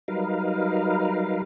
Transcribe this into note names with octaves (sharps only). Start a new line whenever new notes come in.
F#3 G3 D#4 A#4 B4 F5